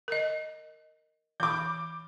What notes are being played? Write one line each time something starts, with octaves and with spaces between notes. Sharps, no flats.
A#4 D#5
E3 B5 D6 G6